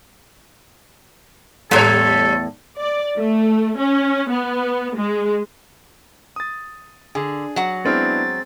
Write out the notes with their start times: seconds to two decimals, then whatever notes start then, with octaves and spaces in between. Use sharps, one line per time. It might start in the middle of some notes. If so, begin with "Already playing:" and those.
1.71 E2 A2 G3 A4 C#5
2.78 D5
3.17 A3
3.78 C#4
4.30 B3
4.96 G#3
6.36 D#6 A6
7.15 D3 G#4
7.56 F#3 F#5
7.85 G#3 B3 C4 D4 E4 F6 A6